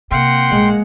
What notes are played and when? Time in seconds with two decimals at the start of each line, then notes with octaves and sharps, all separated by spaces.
0.12 C3 A#3 F#5 G5 C6
0.51 A#1 G#3